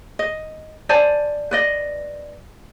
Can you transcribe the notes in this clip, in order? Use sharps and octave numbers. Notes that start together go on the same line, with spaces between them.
D#5
C5 D5 G#5 A5
B4 D5 D#5